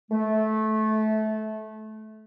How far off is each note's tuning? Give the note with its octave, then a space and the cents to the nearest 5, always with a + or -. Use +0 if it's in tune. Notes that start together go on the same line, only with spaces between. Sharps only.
A3 -20